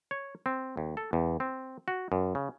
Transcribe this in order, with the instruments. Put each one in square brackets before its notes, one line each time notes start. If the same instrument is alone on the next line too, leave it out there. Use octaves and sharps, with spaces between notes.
[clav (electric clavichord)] C#5
C4
D#2
A4
E2
C4
F#4
F#2
C#3